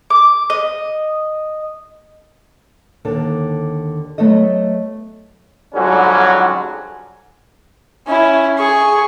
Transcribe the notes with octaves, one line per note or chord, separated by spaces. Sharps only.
D6
D#5
D#2 D3 A4
F#3 A3 B3 A4 D#5
F2 G#2 D3 F#3 G3 C#4
C#4 E4
G#4 C#6